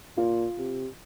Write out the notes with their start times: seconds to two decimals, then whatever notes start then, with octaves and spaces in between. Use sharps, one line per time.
0.17 A#2 F4
0.58 C3